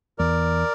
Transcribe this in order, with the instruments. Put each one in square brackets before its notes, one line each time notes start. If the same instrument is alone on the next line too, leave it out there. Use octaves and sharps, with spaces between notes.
[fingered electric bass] E2 [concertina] A#4 D5